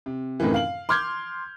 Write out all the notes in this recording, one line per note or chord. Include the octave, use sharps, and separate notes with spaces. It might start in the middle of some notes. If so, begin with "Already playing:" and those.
C3
F#2 A2 C3 D#3 E3
F5 F#7
C6 D6 F6 G6 G#6